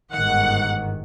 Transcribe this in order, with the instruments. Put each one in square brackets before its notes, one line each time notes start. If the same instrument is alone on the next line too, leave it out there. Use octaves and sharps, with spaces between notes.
[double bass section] G1 G#2 D#3 [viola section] F#5